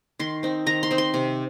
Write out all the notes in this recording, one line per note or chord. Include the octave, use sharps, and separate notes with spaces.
D#3 C6
C4 D#4
D#3 A#5
C6
C4 D#4
C6
C3